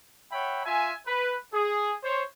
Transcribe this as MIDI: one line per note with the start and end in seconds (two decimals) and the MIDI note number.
0.32 0.62 73
0.32 0.62 76
0.32 0.62 78
0.32 0.62 79
0.32 0.62 83
0.65 0.93 65
0.65 0.93 76
0.65 0.93 80
1.06 1.36 71
1.53 1.93 68
2.03 2.22 72
2.03 2.22 73